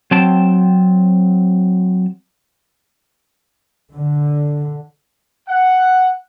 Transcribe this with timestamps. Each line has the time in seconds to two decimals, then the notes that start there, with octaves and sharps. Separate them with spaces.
0.11 F#3 C4 G5 A5
3.92 D3
5.49 F#5